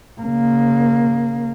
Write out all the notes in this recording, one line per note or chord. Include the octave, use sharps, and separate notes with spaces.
C#3 A#3